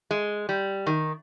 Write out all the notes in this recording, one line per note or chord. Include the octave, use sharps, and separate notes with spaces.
G#3
G3
D#3